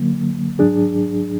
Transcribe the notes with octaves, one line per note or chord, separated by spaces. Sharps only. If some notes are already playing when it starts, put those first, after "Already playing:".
Already playing: D3 F#3 A#3
G#2 F#3 D4 G#4